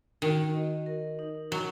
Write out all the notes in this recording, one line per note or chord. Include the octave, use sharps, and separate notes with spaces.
D#3 F#4
D#5
A#4
D#4
F#3 F#4